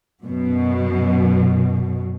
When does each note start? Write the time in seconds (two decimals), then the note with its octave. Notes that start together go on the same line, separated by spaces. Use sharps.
0.25 F#2 B2